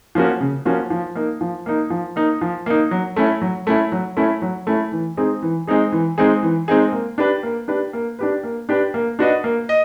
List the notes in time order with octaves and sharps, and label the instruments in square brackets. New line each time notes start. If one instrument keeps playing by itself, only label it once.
[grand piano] F3 A#3 C#4 F#4
C#3
F3 A#3 C#4 F#4
F3
A#3 D#4
F3
A#3 D#4
F3
A#3 D#4
F3
A#3 D#4
F#3
A3 C#4 E4
F#3
A3 C#4 E4
F#3
A3 C#4 E4
F#3
A3 C#4 E4
E3
G#3 C4 D#4 G#4
E3
G#3 C4 D#4 G#4
E3
G#3 C4 D#4 G#4
E3
G#3 C4 D#4 G#4
A#3
D4 G4 B4
A#3
D4 G4 B4
A#3
D4 G4 B4
A#3
D4 G4 B4
A#3
D4 F#4 B4 D#5
A#3
D#5